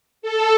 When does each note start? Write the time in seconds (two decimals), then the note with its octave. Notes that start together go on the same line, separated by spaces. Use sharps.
0.22 A4